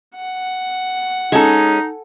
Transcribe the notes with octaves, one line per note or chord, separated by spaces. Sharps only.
F#5
G#3 C#4 D#4 A4 G#5